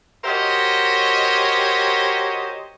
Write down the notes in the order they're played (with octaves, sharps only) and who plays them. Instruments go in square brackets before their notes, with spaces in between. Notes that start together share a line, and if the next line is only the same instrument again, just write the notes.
[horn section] F#4 G4 A#4 C5 C#5 D#5